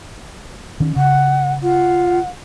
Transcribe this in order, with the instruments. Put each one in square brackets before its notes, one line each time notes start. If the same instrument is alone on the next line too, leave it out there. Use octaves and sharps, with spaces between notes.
[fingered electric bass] D#3 C#4
[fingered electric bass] C#3 [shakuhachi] F#5
[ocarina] F4 [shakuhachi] F#5